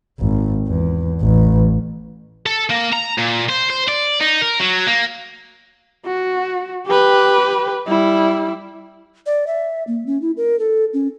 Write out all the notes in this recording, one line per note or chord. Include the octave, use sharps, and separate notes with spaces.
G#1
E2
A1
A4
A#3
A#5
A#2
C5
C5
D5
D#4
A#4
F#3
A#3
F#4
G4 B4
G3 E4
D5
E5
A#3
C#4
E4
A#4
A4
C#4